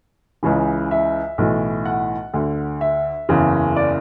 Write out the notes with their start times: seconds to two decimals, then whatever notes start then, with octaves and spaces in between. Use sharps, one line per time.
0.43 C#2 C#3 E3
0.91 E5
1.38 B1 A2 E3
1.85 F#5
2.33 D2 D3
2.81 E5
3.29 F#1 E2 C#3 E3
3.76 D5